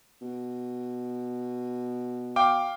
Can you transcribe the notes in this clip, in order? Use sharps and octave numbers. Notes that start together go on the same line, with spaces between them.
B2
F5 G5 D6